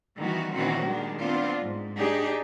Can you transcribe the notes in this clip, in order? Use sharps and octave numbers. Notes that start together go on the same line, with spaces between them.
D#3 E3 G3 B3 F#4
A#2 D#3 E3 C4 C#4 F#4
D#3 G3 G#3 D4
B3 C4 D4 F4
G#2
D4 D#4 G4 G#4